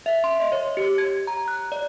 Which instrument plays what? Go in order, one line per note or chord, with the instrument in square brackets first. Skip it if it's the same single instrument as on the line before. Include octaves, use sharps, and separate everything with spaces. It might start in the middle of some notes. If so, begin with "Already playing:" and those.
[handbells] E5
C6
D#5
C#5
G4
G#6
A#5
F#6
D5